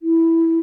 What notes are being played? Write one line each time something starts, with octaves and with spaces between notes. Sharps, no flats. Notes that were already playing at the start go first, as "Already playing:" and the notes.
E4